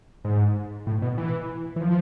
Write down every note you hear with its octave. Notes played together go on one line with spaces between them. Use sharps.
G#2
A2
B2
E3
E3
F3